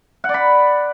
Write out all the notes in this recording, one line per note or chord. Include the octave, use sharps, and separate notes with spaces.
F#5
D5
B5